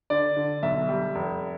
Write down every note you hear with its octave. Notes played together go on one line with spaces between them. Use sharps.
D3 D5
D3
B1 E5
G3
F1